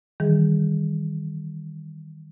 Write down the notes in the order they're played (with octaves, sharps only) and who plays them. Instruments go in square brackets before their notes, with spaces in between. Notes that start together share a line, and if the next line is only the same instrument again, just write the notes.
[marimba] D#3 E3 G3 G#4